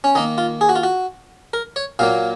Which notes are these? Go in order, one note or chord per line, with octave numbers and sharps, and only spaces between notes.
C#4
D#3 A#3 D#4
F4
G#4
F#4
F4
F#4
A#4
C#5
A#2 F#3 A#3 F5